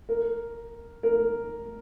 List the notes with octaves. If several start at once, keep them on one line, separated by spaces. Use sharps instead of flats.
A#4
A#4